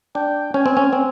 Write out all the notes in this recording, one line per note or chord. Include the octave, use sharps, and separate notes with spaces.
D4 G5
C#4 G#5
C4
C#4
C4